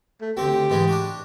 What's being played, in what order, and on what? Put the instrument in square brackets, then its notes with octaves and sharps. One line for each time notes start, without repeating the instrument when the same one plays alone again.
[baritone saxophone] A3
[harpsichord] D2 C4 [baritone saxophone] G4
[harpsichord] G#2 E3 G#3
D4 F#4